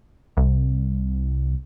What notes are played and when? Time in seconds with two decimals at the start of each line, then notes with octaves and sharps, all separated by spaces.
0.37 C2